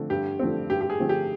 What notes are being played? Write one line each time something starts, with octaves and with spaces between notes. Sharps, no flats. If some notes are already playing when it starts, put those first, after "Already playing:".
Already playing: D3 F3 A3 C4
G2 G4
D3 F3 A3 C4
G2 G4
G4
G#4
D3 F3 A3 C4
G4